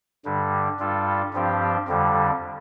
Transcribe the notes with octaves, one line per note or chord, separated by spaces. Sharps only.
G2 D3 G3
G2 G3 F4 A4
G2 F3 C4 G4
F2 D3 G3